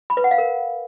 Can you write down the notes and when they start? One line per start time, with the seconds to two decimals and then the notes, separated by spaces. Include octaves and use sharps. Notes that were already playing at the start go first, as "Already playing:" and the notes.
0.10 B5
0.17 B4
0.24 F#5
0.31 F5
0.38 A#4